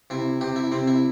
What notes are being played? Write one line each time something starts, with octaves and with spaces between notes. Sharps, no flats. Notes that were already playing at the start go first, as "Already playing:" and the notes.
C3 E4
C3 G4
E4
C3 C4
E4